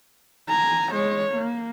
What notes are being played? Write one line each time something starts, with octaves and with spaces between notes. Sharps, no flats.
G#5 A#5
G#3 C#5
A#3